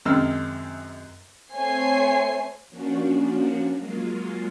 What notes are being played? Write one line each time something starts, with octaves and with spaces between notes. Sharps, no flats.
F#2 C3 D#3 G#3 E6 F6
A3 C4 C5 C#5 G#5 C7
F3 A#3 C#4 D4 F#4
F#3 G#3 A#3 F4